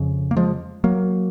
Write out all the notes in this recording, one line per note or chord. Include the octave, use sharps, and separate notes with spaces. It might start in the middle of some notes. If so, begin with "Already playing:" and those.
Already playing: F2 C#3
A#3
F3 G#3
F#3 A#3